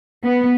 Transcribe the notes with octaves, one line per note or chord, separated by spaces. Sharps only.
B3